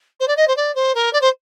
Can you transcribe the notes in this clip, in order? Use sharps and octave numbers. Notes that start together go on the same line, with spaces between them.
C5
D5
D#5
C5
D5
C5
A#4
D5
C5